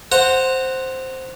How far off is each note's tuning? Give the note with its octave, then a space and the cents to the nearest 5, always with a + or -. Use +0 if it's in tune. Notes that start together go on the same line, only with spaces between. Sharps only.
C5 +0 F#5 +0 A#5 -25